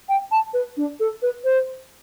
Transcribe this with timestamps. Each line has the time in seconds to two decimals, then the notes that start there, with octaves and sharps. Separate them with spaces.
0.08 G5
0.31 A5
0.53 B4
0.77 D4
1.00 A4
1.22 B4
1.44 C5